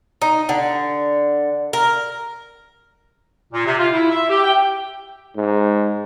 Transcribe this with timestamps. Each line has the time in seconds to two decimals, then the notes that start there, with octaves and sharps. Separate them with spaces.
0.22 D#4
0.49 D3
1.73 A#4
3.53 A#2
3.65 C3
3.78 F4
3.92 E4
4.10 E5
4.30 G4
4.44 G5
5.36 G#2